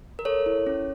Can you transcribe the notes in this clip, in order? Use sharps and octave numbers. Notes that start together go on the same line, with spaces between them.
A#4
A4 C#5
E4
C#4